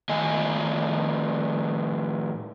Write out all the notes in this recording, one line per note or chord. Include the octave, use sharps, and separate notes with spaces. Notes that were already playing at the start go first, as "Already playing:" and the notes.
A2 D#3 D#5 G#5